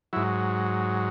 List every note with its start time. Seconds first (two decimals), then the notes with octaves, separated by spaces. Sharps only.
0.13 G#2 F#3 E4